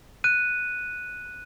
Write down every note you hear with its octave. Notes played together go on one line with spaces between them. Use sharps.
F#6 D#7